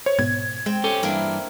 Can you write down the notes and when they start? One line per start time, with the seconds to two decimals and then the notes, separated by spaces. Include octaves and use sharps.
0.06 C5 C#5
0.19 G#2 B2 B3 G#6
0.66 G#3 C4
0.84 C#4 G4 A4
1.03 G2 E3 A#3 D4 E4